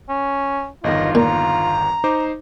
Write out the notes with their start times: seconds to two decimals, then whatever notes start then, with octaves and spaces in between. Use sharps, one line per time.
0.09 C#4
0.84 G1 E2 D#3 F4 D#5
1.15 A#2 A#5
2.04 D#4 C5 D6